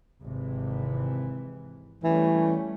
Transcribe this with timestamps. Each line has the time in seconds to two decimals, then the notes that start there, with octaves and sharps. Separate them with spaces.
0.22 G#1 C3 E3
2.04 E3 G3 A3 C#4